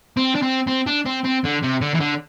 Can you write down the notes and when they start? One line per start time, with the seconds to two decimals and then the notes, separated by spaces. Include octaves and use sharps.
0.17 C4
0.35 D4
0.42 C4
0.67 C4
0.87 D4
1.06 C4
1.24 C4
1.44 D3
1.63 C3
1.82 D3
1.95 E3
2.00 D3